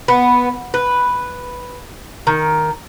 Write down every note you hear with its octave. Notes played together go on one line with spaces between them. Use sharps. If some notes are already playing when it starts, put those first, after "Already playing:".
B3
B4
D#3